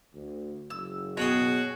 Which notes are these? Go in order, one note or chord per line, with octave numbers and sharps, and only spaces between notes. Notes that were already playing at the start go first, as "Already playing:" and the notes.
D2
F#1 E6
B2 F#4 G#4 C#5 F#5 G5